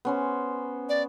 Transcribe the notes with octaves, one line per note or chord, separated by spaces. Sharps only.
B3 C#4 C5
D5